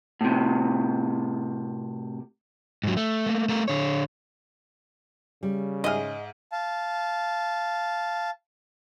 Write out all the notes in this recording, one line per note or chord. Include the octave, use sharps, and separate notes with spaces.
A2 C3
G#2 F#3
A3
A3 A#3
A3 A#4
D3 C#5
C#3 G3
G#2 G#4 D#5 E5 F6
F5 A5